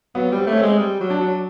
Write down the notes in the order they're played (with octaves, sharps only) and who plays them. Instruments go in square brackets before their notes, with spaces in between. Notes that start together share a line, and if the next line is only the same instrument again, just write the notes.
[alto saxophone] F#3 [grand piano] B3
[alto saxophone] G3 [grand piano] C4
[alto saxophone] A3
[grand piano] C#4
C4
[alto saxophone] G#3
G3
F#3
[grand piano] D4
[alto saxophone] F#3